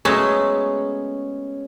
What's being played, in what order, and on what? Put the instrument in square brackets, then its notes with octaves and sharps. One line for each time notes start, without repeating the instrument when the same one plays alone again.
[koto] F#3 G#3 A3 [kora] B3 G#4 C#5 [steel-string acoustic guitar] C#4